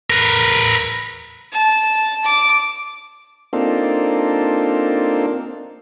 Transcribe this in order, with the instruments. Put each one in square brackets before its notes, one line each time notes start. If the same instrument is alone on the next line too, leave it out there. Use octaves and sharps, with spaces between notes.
[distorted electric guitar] A#4 B4
[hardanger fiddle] A5
D6
[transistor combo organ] A#3 C4 D4 D#4 F4 A4